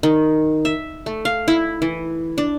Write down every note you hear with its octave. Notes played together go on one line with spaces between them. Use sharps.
D#3
E5
A3
F5
E4
E3
D4